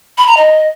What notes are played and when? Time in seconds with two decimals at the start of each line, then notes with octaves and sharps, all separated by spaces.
0.18 B5
0.27 A#5
0.37 D#5